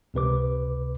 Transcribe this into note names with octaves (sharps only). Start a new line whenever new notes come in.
C#2 C3 B4 D6